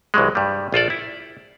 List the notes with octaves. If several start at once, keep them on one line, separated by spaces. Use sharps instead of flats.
C2 E3 F#3 G#3
G2 G3
A#1 F4 A4 D5
E4